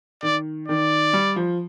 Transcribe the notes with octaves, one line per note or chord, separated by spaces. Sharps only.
D#3 D5
D#3 D5
G3
F3